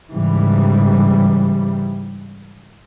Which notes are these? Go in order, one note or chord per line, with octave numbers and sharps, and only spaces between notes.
G#2 C#3 E3 G3